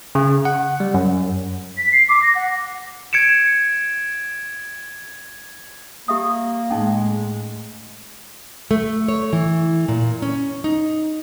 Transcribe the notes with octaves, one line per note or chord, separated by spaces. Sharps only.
C#3
F#5
G3
F#2
B6
C7
D6
A#6
F#5
G#6 C#7 D7 E7
A#3 G4 E5 D#6
A2 G#3 C#4 D#4 A5
A3
C#5
E3
A#2
C#4
D#4